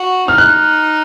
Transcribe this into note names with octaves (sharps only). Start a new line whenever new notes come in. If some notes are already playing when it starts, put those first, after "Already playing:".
Already playing: F#4
D#4 F6
F#6